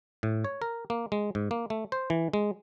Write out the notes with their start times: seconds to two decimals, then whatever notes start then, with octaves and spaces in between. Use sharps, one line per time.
0.23 A2
0.44 C#5
0.62 A#4
0.90 A#3
1.12 G#3
1.35 G#2
1.51 A#3
1.70 A3
1.92 C5
2.10 E3
2.33 G#3